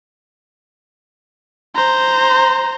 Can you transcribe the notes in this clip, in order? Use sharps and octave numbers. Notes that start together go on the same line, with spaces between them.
C5 A#5